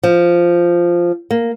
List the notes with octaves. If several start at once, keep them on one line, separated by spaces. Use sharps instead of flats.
F3
A#3